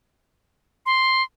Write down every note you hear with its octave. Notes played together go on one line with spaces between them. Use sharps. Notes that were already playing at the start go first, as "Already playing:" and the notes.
C6